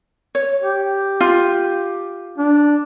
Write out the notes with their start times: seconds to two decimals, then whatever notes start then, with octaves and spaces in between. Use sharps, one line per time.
0.35 C#5
0.62 G4
1.20 F4
2.38 D4